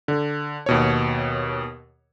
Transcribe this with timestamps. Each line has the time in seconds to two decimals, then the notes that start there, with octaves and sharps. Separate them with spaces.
0.08 D3
0.66 D#2 B2 C#5